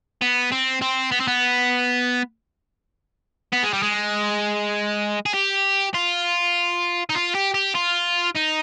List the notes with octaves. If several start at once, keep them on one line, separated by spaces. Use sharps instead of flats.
B3
C4
C4
B3
C4
B3
B3
G#3
G3
G#3
G#4
G4
F4
D#4
F4
G4
G4
F4
D#4